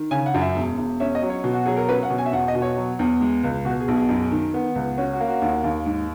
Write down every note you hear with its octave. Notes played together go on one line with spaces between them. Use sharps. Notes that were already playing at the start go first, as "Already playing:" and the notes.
Already playing: D#3
C#3 G#5
F#5
F#2
E5
E1
E1
C#4 E5
D#5
F#3
C#5
B2
F#4
F#3 G#4
A#4
C#4 B4
F#5
B2
G#5
E5
E2 F#5
D#5
B2
C#5
F#3
E2
G#3
C#2
B2 F#4
G#4
B1
G#4
F#2
D#3
B3
C#2
C#4 F#4
F#4
A#3
F#4
D#2
D#2
G#2